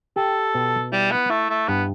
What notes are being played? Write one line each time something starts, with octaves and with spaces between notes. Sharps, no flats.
G4 A4
B2
G3 E4
B3
A3 E4
A3
G2 B3